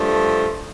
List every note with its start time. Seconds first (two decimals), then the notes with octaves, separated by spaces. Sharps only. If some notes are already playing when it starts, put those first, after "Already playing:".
Already playing: G2 F3 A3